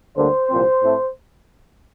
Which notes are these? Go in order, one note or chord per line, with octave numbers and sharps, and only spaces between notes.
D2 D3 G3 A#3 C5
C2 A#2 F3 C4
A2 A3 C4